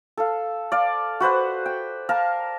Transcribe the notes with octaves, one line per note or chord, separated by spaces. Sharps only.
A4 F5
D5 F5
F#4 B4 C5 F#5
G5
A#4 F5 A5